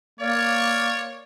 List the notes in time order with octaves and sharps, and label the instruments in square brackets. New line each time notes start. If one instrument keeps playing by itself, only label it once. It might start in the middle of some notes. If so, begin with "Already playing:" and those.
[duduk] A#3 [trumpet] C#5 [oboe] D5